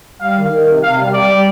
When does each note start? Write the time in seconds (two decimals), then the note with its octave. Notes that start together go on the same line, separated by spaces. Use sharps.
0.21 G3 F5
0.37 D#3
0.52 D#3
0.67 C3
0.83 C3 F5
0.98 G3
1.13 G3 D5
1.30 G3